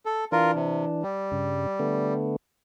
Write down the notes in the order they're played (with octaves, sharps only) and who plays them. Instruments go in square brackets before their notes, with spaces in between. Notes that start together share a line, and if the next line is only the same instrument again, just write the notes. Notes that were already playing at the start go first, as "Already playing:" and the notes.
[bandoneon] A4
[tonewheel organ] E3 D4 [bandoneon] F4 A#4
[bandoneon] C3
G3
[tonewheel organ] G2 C#3
D3 A3 B3